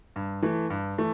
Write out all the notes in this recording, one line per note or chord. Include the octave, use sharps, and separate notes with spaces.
G2
E3 A3
G2
E3 A3